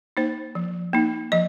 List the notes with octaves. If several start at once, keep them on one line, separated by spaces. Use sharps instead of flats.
A#3 D#4 C5
F3
A#3 D#4
F3 D#5